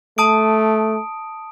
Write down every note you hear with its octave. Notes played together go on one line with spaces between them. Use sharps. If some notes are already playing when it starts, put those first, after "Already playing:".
A3 A5 D#6 D7